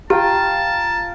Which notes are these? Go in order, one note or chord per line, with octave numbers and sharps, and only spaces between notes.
F4 G4 G5 A5 A#5